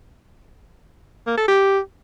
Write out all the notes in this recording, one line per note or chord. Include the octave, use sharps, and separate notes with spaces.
A#3
A4
G4